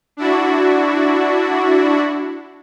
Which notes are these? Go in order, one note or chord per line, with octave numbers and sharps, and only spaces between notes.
D4 E4 F#4